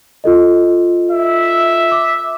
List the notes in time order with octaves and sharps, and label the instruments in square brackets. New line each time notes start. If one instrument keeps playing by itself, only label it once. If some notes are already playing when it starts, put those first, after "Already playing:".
[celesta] F4 A4 D#5
[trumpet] E5
[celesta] D6